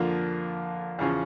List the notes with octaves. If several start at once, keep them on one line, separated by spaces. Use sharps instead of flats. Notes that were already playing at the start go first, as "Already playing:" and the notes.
Already playing: F2 D3 F3 A#3
E2 C#3 F3 C#4